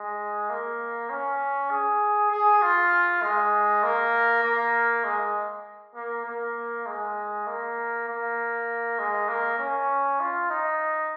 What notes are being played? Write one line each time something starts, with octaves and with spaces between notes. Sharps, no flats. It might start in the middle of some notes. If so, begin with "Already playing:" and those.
Already playing: G#3
A#3
C#4
G#4
G#4
F4
G#3
A#3
A#3
G#3
A#3
A#3
G#3
A#3
A#3
G#3
A#3
C#4
F4
D#4